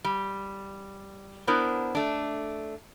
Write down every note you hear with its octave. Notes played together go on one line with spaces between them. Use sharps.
G3
B3 D4 E4 A#4 C5
A3 D4